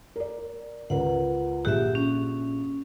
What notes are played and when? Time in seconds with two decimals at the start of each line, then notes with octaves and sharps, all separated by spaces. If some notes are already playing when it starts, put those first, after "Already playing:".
0.16 A#4 D5
0.90 C#2 A#4 B4 F#5
1.65 A#1 G4 G#4 E5 F#6
1.95 C#4